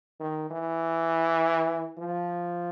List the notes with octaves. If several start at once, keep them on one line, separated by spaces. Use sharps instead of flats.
D#3
E3
F3